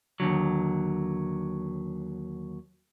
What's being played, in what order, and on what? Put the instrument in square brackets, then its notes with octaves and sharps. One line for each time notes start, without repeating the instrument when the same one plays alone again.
[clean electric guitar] D#2 A2 D3 F#3